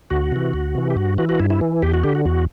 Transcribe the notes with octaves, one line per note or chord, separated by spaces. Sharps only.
D2 F#4
C3 E3
D2
C3 E3
G4
G2 F#4
E3 F#4
F#4
G2 E4
E4
E3
E2 G4
F#4
D3 G4
F#4
E2 F#4